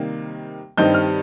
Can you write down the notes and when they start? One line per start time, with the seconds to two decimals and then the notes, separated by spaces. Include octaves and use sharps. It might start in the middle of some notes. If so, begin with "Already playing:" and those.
Already playing: C3 D#3 G3 A#3
0.77 G2 D#3 G3 C4 D#4 G6
0.94 F6